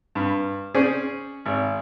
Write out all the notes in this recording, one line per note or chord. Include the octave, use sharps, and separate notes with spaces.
G2
C#4 G#4 C5 D5
G#1